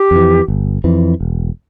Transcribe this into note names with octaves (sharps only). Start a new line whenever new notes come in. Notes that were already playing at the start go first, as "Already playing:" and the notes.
Already playing: G4
F2 E3
G1
F2 E3
E1